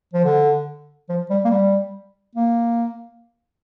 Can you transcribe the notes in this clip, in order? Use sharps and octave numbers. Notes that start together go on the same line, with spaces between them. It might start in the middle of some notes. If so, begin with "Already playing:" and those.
F3
D3
F3
G3
A#3
G3
A#3